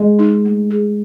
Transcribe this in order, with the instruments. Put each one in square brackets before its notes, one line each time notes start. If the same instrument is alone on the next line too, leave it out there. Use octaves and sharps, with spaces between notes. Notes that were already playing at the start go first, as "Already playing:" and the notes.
Already playing: [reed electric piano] G#3 [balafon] D#5
[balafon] D#4
A3
G#4